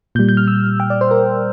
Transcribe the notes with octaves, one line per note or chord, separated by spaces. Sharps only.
A#2 G3 G6
G6
F6
E6
G5
D5
C5
A#4